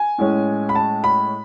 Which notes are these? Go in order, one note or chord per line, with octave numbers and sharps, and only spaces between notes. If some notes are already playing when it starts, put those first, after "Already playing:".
Already playing: G#5
A2 G#3 C#4
B5
A5
B5